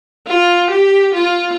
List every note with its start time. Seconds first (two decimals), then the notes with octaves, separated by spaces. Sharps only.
0.27 F4
0.71 G4
1.14 F4